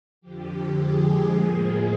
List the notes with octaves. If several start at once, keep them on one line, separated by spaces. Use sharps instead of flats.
F2 D3 F3 G4
G#3 G#4
A2 F3 G#3 A#3 G#4